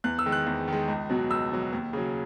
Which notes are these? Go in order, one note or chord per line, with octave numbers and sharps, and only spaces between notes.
E2 F#6
E6
D#3 G#3
F#6
E2
D#3 G#3
C#2
B2 F#3
C#2 E6
B2 F#3
D#2
C#3 F#3